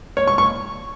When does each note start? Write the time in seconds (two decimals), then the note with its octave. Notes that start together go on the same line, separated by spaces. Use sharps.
0.17 C#5
0.27 C#6
0.38 C#6